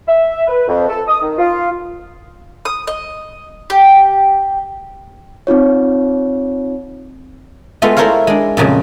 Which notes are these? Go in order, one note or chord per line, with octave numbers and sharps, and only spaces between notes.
E5
B4
F2
A4
D#6
D#3
F4
D#6
D#5
G4
C4 D#4 F4 C#5
G#3 A3 B3 F4 E5
E4 A4 A#4 C5 C#5 F5
G#3 D4
F2 A#2 C#3 F#3